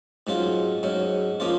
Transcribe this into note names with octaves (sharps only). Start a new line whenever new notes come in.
G#2 F#3 C#4 F4
G#2 F#3 C#4
F3 A#3 C#4 F4